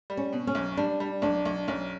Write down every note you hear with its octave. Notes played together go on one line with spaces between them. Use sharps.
G3
C#4
B2
C#4
B1
G3 D4
G3
B1 D4
B1
B1 C#4